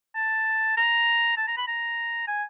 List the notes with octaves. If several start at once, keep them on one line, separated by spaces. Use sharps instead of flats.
A5
A#5
A5
A#5
B5
A#5
G#5